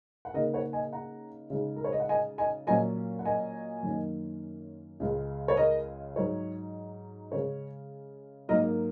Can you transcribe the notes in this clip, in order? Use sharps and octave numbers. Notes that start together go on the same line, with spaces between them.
F#5
C#3 A#3 D#4 A#4 D#5
C#5 F#5
D#5 G#5
F#5 A#5
C#3 G#3 D#4
A#4
C#5
D#5
F#5
D#5 G#5
D#5 G#5
A#2 F#3 C#4 D#5 G#5
F#5
D#5 G#5
F#2 D#3 A#3 C#4
C#2 C#3 G#3
C#5
A#4 D#5
G#2 F#3 D#4 C#5
C#3 G#3 C#4 C#5
G#2 F#3 A#3 A#4 D#5